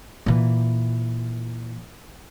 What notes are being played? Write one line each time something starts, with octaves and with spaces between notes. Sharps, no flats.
A#2 E3